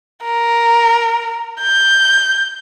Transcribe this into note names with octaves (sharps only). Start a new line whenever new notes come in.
A#4
G6